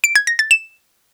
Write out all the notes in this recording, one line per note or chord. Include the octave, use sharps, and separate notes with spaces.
D7
G#6
A#6
A6
E7